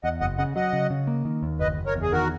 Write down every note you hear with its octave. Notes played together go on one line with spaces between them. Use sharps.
E2 D#5 F#5
F#1 D#5 F#5
C#3 D#5 F#5
F#3 D#5 F#5
C#3
C#3
A#3
D#3
D#2
F#1 B4 D#5
F#1
A#4 C#5
E2
G#4
D#3 F#4 A#4